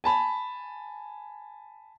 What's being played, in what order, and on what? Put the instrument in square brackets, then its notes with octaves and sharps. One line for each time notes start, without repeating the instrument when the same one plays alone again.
[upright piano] G#5 A5 B5